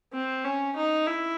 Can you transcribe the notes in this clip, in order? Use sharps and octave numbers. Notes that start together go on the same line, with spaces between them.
C4
C#4
D#4
E4